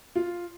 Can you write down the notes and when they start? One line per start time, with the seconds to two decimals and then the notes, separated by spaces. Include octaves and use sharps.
0.15 F4